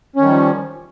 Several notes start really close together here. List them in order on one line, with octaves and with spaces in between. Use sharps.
C#4 D#3 G3 F3